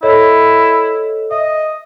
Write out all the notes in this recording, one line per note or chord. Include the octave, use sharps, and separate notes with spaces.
E4 A4 C#5 D#5
D#5 E5